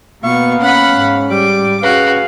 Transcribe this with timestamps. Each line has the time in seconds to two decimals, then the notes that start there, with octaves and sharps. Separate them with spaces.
0.24 B2 A#3 B3 F5 C#6
0.61 C#4 F#5 B5
0.94 G#2
1.30 G3 D6
1.83 C#4 F#4 G#4 B4 F5